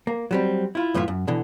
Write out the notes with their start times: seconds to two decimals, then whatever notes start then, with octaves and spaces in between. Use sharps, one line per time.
0.07 A#3
0.31 F#3 G3 C4
0.75 E4 F4
0.95 F#2 A2 E3 F4 E5
1.08 F#2
1.27 B2 D3 E3